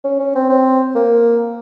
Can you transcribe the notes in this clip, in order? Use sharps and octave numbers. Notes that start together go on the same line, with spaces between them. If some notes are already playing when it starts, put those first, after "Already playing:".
C#4
C#4
C4
C4
A#3